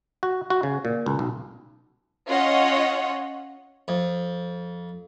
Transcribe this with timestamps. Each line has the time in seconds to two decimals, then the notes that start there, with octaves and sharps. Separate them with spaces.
0.23 F#4
0.50 F#4
0.63 C#3
0.85 A#2
1.06 C#2
1.19 B1
2.28 C#4 F4 C#5 D#5 F#5
3.88 F2